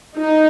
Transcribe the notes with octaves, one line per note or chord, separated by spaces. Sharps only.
D#4